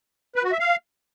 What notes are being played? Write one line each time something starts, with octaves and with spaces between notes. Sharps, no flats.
B4
F#4
E5
F5